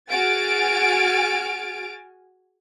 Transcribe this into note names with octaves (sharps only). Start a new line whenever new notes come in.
F#4 G#4 G#5 F6 A6 D7